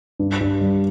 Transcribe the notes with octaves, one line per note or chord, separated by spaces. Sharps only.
G2
G2
G3